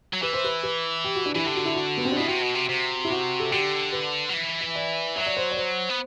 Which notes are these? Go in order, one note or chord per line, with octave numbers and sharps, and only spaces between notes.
F#3
E3 B4
C5
B4
B4
G4
F#4
D4
E3 E4
D3 G4
F#4
E4
F#4
B3
C4
D4
B2 E4
C3 F#4
B2
C3
C3
E4
F#4
A4
D3 G4
B4
F#3
E3
E5
D5
F#3 E5
D5
C5
D5
C5
B3